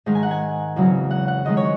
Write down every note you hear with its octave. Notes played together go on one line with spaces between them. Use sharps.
G#2 D#3 G#3
G#5
F#5
G#5
E2 C#3 F#3 C4
F#5
F#5
E2 D#3 G#3 D#5
C#5